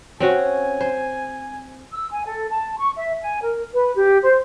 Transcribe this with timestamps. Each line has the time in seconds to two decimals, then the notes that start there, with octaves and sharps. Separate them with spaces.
0.20 C4 C#4 F#4 G#5
0.81 C5
1.92 E6
2.11 G#5
2.26 A4
2.49 A5
2.78 C#6
2.96 E5
3.21 G#5
3.42 A#4
3.72 B4
3.94 G4
4.22 C5